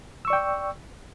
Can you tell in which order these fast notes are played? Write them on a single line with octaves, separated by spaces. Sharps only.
E6 C#6 D5 G5